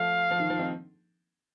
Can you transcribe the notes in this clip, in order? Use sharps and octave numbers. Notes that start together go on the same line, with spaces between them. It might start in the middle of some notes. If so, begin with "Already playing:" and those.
Already playing: F3 A3 F5
F3
D#3
F3
C4 D#4